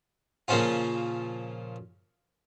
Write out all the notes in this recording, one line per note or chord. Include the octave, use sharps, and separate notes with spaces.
A#2 C#3 F3 C#4 F4